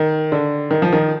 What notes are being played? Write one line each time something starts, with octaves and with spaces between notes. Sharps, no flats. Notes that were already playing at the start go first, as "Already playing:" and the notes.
Already playing: D#3
D3
D#3
F3
D#3